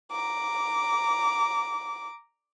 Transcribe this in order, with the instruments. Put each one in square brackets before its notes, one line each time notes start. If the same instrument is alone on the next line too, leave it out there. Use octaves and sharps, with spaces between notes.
[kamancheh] A#5 D6